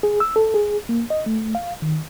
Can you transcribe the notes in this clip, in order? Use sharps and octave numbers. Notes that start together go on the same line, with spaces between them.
G#4
E6
A4
G#4
A#3
D#5
A3
F5
D#3